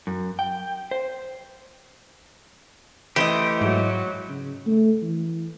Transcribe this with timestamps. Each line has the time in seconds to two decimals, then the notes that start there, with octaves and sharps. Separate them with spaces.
0.07 F#2
0.39 G5
0.91 C5
3.16 E3 A3 G4 C5 D#5
3.61 G#2 F#3
4.29 C#3
4.67 A3
5.02 E3